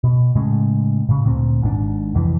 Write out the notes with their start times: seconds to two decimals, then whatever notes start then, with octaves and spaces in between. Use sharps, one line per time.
0.04 B2
0.35 A2 C#3 G#3
1.09 A2 C#3
1.25 D2 A#2 C4
1.62 G#1 G#2 D3 D4
2.15 C2 F2 E3